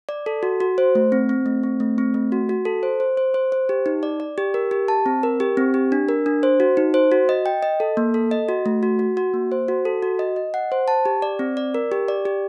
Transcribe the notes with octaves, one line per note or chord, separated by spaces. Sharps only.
D5
A4
F#4
F#4
C5
A3
C4
C4
A3
C4
A3
C4
A3
F#4
F#4
A4
C5
C5
C5
C5
C5
G4
D#4
D5
D5
G4
A#4
G4
A5
C4
A#4
G4
C4
G4
D4
A#4
D4
C5
F#4
D#4
C5
F#4
D#5
G5
D#5
A4
A#3
A4
D#5
F#4
A3
F#4
F#4
F#4
A#3
C5
F#4
A4
F#4
D#5
D#5
F#5
C5
A5
G4
D5
C4
D5
A#4
G4
D5
G4